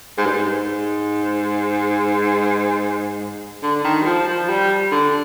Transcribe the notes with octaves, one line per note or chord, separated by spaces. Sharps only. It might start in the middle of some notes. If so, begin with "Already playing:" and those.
G#2
G2
G#2
D3
D#3
G3
F3
F3
G3
D3